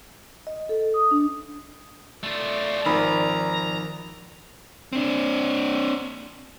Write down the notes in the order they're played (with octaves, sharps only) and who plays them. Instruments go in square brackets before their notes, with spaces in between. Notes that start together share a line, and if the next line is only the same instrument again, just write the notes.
[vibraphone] D#5
A4
D#6
D4
[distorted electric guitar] A3 F4 [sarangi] D5
[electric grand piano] G#1 B5 [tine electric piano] D#3 F3 [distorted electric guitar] A#5
[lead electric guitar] C4 D4